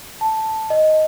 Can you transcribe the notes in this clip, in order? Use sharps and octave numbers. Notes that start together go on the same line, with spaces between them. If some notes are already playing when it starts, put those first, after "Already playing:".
A5
D#5